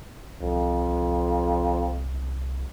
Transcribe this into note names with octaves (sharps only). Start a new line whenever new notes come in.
C2 F2